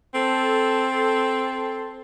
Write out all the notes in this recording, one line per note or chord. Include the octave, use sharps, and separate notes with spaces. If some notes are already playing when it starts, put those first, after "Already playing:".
C4 A4